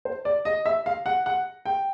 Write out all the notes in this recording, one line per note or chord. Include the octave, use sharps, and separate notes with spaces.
C5
D5
D#5
E5
F5
F#5
F#5
G5